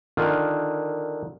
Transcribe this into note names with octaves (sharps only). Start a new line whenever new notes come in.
D3 D#3 F4